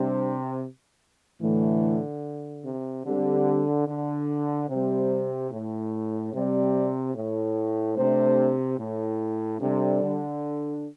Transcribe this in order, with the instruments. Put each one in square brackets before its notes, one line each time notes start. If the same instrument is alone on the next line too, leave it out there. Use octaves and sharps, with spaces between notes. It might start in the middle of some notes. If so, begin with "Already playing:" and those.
Already playing: [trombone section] C3 [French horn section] G3 D4 G4 C5
[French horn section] A2 E3 A3 [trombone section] D3
[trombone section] C3
[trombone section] D3 [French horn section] G3 C4 G4
[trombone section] D3
[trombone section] C3 [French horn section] G3 C4 G4 C5
[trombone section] A2
[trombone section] C3 [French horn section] G3 C4 G4 D5
[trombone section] A2
[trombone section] C3 [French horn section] A3 D4 C5
[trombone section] A2
[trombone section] C3 [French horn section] G3 D4 A4 D5
[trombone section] D3